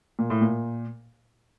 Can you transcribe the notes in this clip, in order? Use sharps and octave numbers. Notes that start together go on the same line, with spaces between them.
A#2
A2
A#2